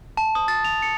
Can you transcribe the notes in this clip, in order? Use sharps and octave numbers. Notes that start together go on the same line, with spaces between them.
A5
D#6
A6
F7
C#7